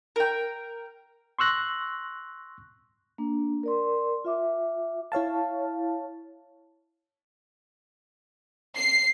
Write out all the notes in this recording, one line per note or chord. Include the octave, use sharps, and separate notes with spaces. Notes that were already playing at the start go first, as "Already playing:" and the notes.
A#4 G5
C6 C#6 E6 F#6 A#6
A#3 D4
A#4 D5 C6
F4 E5 D6
E4 C#5 F5 A5
C7